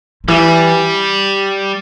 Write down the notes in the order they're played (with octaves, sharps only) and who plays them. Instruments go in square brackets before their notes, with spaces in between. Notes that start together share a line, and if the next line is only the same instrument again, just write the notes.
[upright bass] D3
[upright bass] E3 [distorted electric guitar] G3